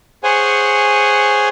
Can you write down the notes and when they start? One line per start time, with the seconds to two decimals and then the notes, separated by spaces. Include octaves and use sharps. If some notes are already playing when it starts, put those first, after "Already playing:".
0.24 G#4 C5 C#5 F#5 G#5